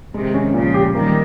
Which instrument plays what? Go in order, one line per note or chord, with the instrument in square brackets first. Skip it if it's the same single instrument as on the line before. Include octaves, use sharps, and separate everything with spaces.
[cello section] C3 D#3 [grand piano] G#3
[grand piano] C#4
[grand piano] A#2 [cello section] C#3 F3
[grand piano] G4
[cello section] D#3 G3 [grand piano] A#3